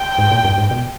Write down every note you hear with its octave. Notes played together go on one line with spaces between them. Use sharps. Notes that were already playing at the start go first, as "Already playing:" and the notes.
Already playing: G5
G#2
A#2
G2
G#2
B2